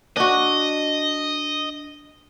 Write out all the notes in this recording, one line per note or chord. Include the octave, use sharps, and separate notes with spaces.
D4 F#4 D#5